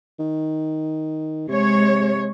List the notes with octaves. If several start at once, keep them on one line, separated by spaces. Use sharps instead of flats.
D#3
C3 G#3 C#5